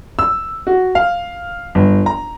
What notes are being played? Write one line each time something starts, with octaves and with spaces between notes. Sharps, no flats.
E6
F#4
F5
G1
A#5